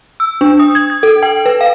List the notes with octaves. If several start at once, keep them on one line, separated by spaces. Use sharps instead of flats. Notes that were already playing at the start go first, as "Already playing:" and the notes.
E6
D4
D#6
G#6
G#6
A4
G5
B4
F5